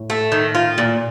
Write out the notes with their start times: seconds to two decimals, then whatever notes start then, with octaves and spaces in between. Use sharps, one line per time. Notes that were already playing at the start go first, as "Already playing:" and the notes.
Already playing: A2
0.10 A3
0.32 D#3
0.55 F4
0.78 A#2